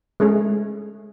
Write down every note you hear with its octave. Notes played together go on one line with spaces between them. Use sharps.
G#3 A3 C#4 G#4